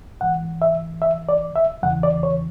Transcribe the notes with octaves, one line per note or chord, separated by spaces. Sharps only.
G#2 E3 F#5
E5
E5
D5
E5
E2 C#3 E3 F#5
D5
C#5